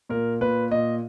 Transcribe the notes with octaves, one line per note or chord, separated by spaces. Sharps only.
A#2 A#4
A#2 B4
A#2 D#5